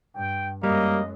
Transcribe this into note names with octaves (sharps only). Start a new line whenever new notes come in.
G2 G5
F#2 G3 G#3 A#3 D#5